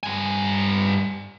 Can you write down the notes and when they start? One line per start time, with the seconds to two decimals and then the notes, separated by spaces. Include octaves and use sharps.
0.03 G2 G#5